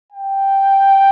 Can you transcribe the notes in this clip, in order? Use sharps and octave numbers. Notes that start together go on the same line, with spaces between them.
G5